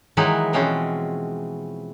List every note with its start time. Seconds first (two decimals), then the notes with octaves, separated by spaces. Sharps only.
0.17 D#3 E3 F#3 G#3 D#4 E4
0.53 B2 E3 F3 G#3 C4 C#4